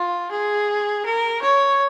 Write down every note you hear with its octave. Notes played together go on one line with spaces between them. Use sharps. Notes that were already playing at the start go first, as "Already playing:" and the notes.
Already playing: F4
G#4
A#4
C#5